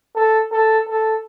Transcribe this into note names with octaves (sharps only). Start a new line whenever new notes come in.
A4
A4
A4